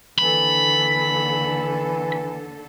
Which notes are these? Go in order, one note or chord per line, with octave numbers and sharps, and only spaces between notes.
D#2 D3 E3 A4 B5